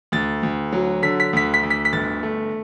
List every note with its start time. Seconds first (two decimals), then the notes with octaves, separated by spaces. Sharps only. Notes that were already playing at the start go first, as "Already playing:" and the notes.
0.12 D2 A6
0.43 D2
0.72 F#3
1.02 D3 B6
1.20 B6
1.33 D2 B6
1.54 B6
1.63 D2
1.70 B6
1.85 B6
1.93 G1 A6
2.23 A3